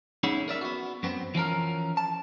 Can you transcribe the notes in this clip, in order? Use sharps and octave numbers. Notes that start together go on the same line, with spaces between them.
C#4 D#4 E4 G#4 C#5 F#5
A#4 D5 E5
B3 F#4
F#2 B3 C4
E3 F3 C#4 A#4
A5